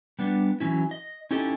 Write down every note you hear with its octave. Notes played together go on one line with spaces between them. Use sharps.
G3 B3 D4
E3 F#3 G3 C#4 E4
D#5
C#4 D#4 E4 G4 A4 D#5